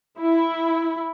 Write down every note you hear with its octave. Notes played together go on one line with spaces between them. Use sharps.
E4